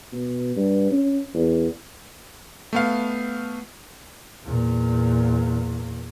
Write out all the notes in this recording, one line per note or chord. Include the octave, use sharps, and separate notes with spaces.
B2
G2
C#4
E2
A3 B3 F5
E2 A#2